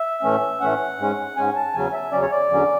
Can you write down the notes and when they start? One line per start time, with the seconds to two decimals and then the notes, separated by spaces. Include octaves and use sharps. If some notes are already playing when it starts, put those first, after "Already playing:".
Already playing: E5
0.22 A2 E3 A3 C#4
0.61 A2 E3 A3 C#4 F#5
0.99 G#2 G#3 C#4
1.37 G#2 G#3 C#4 G#5
1.55 A5
1.74 E2 C#3 F#3 C#4 G#5
1.93 E5
2.12 E2 C#3 F#3 C#4 D5
2.22 C#5
2.31 D5
2.50 E2 D3 F#3 C#4